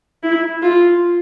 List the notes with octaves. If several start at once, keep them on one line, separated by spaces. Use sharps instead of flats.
E4
F4